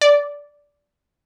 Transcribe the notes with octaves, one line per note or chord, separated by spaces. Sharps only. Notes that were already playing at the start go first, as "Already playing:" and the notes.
D5